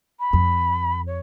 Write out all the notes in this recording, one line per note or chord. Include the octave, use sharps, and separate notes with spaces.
B5
F2
C#5